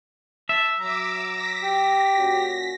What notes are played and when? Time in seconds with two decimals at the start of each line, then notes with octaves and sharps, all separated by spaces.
0.49 E5 A5
0.80 F#3 A#5 D6 E6
1.30 A#6 B6
1.63 G4
2.17 A#2 C#4 F#4